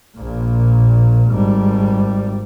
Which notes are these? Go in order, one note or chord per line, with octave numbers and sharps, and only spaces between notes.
A#1 A#2
G#1 G3